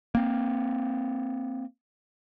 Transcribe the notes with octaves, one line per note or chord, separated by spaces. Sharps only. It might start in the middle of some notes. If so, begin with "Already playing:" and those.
A#3 C4